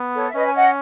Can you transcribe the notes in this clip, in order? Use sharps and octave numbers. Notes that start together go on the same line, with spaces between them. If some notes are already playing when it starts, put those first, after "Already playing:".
Already playing: B3
A4 C#5
E5
C#4 B4 D#5
G#5
D#5 F#5